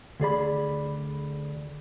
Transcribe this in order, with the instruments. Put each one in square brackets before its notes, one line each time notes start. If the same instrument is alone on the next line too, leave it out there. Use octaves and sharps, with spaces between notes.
[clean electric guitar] D2 G#4 D5 B5